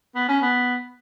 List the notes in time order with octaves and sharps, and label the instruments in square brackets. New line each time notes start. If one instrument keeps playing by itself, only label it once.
[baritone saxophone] B3
C#4
B3